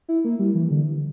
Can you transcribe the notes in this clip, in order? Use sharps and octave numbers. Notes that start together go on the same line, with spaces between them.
E4
A#3
G3
E3
D3